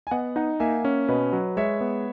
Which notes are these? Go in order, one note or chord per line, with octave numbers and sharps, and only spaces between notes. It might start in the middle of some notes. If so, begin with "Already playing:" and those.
G#5
B3 D#5 F#5
D#4 D#5 F#5
A#3 E5 G#5
C#4
B2 B4 D#5
F#3
G#3 C#5 E5
B3